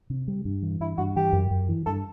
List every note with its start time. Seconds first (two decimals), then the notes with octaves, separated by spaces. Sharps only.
0.10 C3
0.28 G3
0.45 G2
0.62 E3
0.80 G2 E4
0.97 G2 F#4
1.16 E3 G4
1.33 F#2
1.51 F#2
1.69 E3
1.86 G2 A4